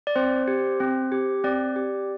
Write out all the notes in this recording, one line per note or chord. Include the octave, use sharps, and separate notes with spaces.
D5
C4 C5
G4
C4
G4
C4 D5
G4